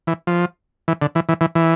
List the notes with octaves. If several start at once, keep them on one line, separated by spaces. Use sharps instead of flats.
E3
F3
E3
D3
E3
E3
E3
E3